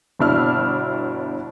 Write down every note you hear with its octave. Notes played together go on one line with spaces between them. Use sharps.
G1 B2 D4 E4 E6 F6